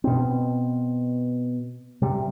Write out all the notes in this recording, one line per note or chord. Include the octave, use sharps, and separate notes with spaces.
B2 C4
C3 G3